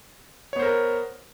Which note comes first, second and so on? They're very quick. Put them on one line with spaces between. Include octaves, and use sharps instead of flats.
C#5 B3 C5 A#4